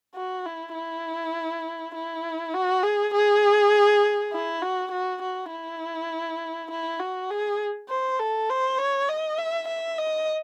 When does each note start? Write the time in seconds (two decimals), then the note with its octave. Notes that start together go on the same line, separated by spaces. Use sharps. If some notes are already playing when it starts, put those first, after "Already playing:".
0.15 F#4
0.46 E4
0.75 E4
1.95 E4
2.55 F#4
2.83 G#4
3.14 G#4
4.33 E4
4.62 F#4
4.92 F#4
5.22 F#4
5.51 E4
6.71 E4
7.00 F#4
7.30 G#4
7.89 C5
8.19 A4
8.50 C5
8.78 C#5
9.09 D#5
9.38 E5
9.68 E5
9.98 D#5